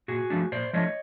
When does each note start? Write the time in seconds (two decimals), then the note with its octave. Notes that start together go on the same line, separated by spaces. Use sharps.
0.08 A#2 F#4 G#4
0.30 F3 A3 D4
0.52 A#2 C5 D5
0.73 F3 A3 D4 C#5 D#5